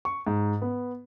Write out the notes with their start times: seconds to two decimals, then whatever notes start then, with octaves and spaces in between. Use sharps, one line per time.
0.05 C#6
0.27 G#2
0.62 B3